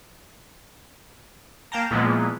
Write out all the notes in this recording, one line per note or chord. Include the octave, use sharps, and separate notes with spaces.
A#3 F5 G5 A5 A#5
A#2 E3 F3 G#3 B3